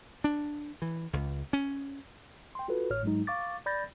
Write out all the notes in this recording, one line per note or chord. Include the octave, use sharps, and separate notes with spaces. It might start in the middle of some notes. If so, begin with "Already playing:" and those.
D4
E3
C#2
C#4
G5 C6
F4 F#4 A4 B4
G#1 A2 C#5 F6
G#2 F#3 G#3 D#4
F5 C#6 D6 A6
D5 B5 G6 A6 A#6